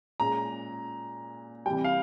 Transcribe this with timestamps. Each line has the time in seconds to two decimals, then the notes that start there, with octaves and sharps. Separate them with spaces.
0.20 A#2 G#3 C#4 A#5
1.66 C3 E3 G3 G5
1.84 F5